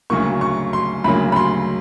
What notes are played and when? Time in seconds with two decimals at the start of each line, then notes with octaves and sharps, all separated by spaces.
0.10 D2 C#3 F#3 A#3 C#6
0.41 C#6
0.73 C6
1.04 D2 C#3 F#3 A#3 B5
1.32 B5
1.36 C6